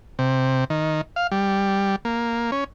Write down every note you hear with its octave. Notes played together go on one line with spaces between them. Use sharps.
C3
D#3
F5
G3
A#3
C#4